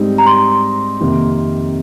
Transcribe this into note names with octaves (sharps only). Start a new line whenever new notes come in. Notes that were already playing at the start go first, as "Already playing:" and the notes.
Already playing: G#2 G3 C4 D#4 G4
A#5
C6
F2 C3 D#3 A#3